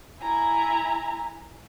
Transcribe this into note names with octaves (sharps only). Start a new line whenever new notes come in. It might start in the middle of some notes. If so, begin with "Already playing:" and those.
E4 G#5 A#5